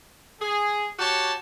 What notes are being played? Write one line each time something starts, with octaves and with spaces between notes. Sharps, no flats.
G#4
F#4 G4 C#5 A5